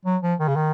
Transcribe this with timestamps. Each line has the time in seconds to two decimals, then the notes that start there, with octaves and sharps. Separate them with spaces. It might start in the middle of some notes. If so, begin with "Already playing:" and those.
0.05 F#3
0.22 F3
0.39 D#3
0.48 C#3
0.56 D#3